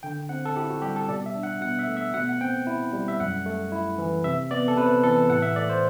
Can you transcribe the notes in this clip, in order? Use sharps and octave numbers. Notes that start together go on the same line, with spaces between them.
D3 G5
C4 F#5
A4
E4 G4
F#4
G3 G4
A4
B2 D5
E5
D4
F#5
B2 F#5
E5
A3
E5
B2 F#5
F#5
C4 G5
E4
G3
E5
F#2 F#5
A3
E4
E3
C3 E5
B3 D5
A4
C3 B4
E3 A4
A2 F#5
E5
A3 D5
C5